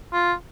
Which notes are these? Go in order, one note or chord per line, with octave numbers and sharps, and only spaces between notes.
F4